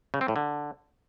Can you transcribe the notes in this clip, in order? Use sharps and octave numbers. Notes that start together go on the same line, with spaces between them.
C#3
C4
A2
D3